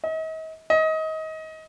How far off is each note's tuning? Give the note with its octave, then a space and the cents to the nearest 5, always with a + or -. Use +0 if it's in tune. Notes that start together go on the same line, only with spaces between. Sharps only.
D#5 +40
D#5 +25